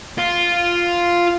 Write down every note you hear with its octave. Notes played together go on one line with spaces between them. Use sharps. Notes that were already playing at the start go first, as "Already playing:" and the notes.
F4